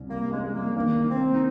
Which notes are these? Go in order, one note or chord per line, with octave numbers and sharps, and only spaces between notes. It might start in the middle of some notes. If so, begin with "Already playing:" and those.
Already playing: C2 C3 C#4
G3 A#3
G#3 C#4
G#3
C2 A#3
D#3 A#3
D#3
C4
A#3
D#4